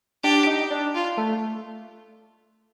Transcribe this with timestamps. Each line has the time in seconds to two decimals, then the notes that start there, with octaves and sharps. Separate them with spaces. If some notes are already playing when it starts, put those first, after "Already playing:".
0.23 D4 G4
0.47 D#4
0.71 D4
0.95 F4
1.17 A3